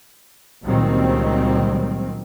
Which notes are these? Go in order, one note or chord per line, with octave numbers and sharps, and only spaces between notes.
C#2 A#2 D#3 F#3 G3 C4